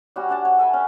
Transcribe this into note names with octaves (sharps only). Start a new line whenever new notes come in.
G3 C#4 F#4
D4 F#5 A5
C#5
A4 E5 G#5 B5
C#4